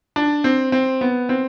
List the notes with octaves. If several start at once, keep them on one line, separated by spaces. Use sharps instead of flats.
D4
C4
C4
B3
C4